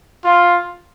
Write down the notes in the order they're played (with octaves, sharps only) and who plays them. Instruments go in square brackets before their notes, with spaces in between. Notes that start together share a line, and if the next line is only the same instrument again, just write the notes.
[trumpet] F4